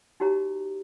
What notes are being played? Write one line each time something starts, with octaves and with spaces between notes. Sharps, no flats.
D#4 F#4 G4 C#5 A#5